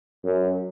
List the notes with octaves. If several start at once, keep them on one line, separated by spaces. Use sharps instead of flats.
F#2